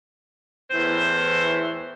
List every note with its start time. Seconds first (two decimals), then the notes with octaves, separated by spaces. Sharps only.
0.71 E2 A2 E3 C5